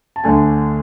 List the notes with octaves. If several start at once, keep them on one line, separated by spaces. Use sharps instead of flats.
A5
D2 D3 A3 D4 G#5